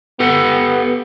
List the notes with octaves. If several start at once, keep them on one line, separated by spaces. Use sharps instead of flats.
B3 G4 A4 F#5